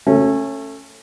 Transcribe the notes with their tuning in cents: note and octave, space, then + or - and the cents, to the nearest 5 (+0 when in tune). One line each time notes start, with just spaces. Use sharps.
A3 +15 C#4 -15